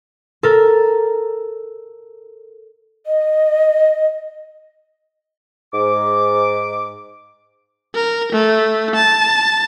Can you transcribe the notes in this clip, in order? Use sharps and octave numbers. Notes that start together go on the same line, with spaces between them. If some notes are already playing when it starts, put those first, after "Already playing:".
A4 A#4
D#5
G#2 D6
A#4
A3
A5